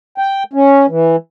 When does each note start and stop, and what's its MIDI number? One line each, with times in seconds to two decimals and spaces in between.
0.18 0.43 79
0.53 0.86 61
0.89 1.16 52